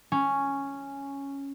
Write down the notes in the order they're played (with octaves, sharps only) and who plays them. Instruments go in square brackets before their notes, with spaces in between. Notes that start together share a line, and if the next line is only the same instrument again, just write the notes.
[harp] C#4